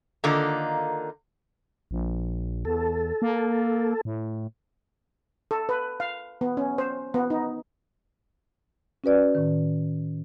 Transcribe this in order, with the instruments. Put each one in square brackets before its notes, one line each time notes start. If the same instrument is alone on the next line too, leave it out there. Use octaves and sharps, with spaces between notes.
[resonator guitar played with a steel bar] D3 D#3 A#3 D#4 F4
[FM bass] A#1
[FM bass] E2 [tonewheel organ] A4
[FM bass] A#3
A2
[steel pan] A4
B4
F5
B3
C#4
C5
B3
D#4
[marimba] C#4 F#4 B4 D5
A2 D#3